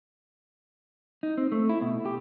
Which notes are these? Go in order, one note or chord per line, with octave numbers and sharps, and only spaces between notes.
D#4
C4
A3
E4
B2
G4